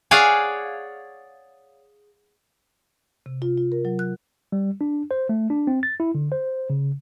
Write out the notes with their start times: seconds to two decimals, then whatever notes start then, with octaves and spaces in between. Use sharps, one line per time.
0.11 G#4 C#5 D5 F5 F#5 G#5
3.26 C3
3.42 F4
3.57 F4
3.72 A#4
3.85 F#3
3.99 F#6
4.52 G3
4.81 D4
5.11 C5
5.29 A3
5.50 D4
5.67 C4
5.83 A6
6.00 E4
6.15 D3
6.32 C5
6.70 C#3